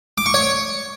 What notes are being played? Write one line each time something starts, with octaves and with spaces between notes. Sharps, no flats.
D6
C#6
C#5